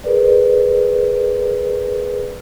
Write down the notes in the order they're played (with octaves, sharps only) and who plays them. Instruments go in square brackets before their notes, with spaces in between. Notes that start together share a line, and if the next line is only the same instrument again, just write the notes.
[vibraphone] G#4 A#4 B4 D5